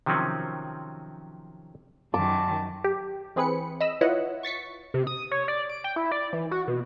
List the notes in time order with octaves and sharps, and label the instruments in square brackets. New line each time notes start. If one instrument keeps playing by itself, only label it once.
[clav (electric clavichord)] C3 D#3 F3 F#3 C4 C#4
[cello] F#2 D#3 [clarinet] A5 [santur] D6
[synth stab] G4
E3 C4 G#4 B4 B5 C#7
D#5 B5 E6
E4 F4 B4 C#5 D#5 F#5
C#6 A6 B6 C#7
[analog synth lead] C3
D#6
C#5
D5
D7
G5
E4
D5
E3
F#4
B2